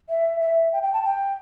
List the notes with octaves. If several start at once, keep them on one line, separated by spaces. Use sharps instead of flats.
E5
E5
G5
G5
A5
G5